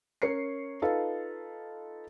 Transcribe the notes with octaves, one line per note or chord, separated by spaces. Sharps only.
C#4 A#4 C#5 C7 C#7
D#4 F4 A4 B4 F5